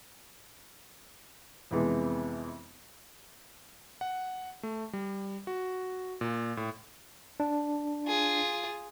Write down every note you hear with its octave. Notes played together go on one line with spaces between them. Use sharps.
F2 C3 E3 G#3 B3
F#5
A3
G3
F#4
A#2
A2
D4
F4 G#4